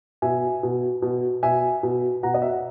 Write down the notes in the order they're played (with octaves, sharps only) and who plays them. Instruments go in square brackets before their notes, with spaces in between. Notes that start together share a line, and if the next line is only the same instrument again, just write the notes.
[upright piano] B2 E5 G#5
B2
B2
B2 E5 G#5
B2
B2 F#5 A#5
D#5
E5
F#5